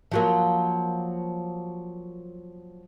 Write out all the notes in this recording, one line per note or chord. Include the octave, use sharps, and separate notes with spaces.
F3 F#3 A#3